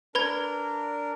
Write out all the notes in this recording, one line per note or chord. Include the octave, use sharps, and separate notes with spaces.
D4 A#4 B4 B5 G#6